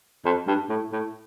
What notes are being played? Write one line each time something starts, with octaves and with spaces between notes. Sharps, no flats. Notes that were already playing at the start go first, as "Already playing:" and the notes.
F2
G2
A2
A2